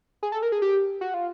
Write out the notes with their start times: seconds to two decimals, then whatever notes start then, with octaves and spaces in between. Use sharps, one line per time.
0.23 G#4
0.32 A4
0.43 A#4
0.52 G#4
0.62 G4
1.01 F#4
1.14 F4